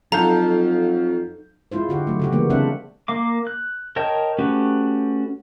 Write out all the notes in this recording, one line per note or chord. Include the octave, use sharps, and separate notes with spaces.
F2 F#3 D#4 F#4 A4 F5 A#5 G6
G#3 E4 F4 C5
D3 F#4 G4
F#3 A3
C#3 F#4 G4
E3 G3 G#3 A#3 B3
C#3 G#3 C4 D4 E5 F#5
A#3 F5 D6
F#6
A#4 C#5 D#5 G5 A5
A3 C#4 F#4 G4 B4